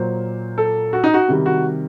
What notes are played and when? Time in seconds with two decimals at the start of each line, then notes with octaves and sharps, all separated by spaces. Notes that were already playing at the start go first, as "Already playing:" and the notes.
Already playing: A#2 F#3 A#3 C5
0.58 A4
0.93 F#4
1.04 D#4
1.14 F#4
1.28 C3 D#3 G3
1.46 F#4